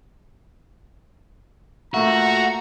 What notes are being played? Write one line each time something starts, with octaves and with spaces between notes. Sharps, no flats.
A#2 A3 F#4 E5 A#5